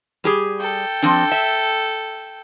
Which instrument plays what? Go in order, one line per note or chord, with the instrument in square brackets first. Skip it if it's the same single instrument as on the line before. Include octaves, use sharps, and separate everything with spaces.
[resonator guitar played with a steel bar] G3 G4 G#4
[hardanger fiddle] A4 G5
[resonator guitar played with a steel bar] F3 C4 D4
E5